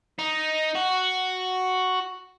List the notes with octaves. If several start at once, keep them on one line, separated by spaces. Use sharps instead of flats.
D#4
F#4